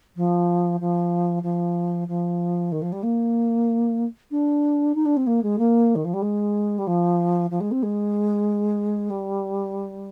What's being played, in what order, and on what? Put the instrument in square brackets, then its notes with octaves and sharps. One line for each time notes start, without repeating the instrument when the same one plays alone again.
[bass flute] F3
F3
F3
F3
D#3
F3
G3
A#3
D4
D#4
D4
C4
A#3
G#3
A#3
D#3
F3
G3
G#3
G3
F3
F3
G#3
C4
G#3
G3